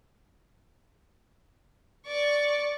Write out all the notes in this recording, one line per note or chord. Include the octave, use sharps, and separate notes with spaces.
D5 C#6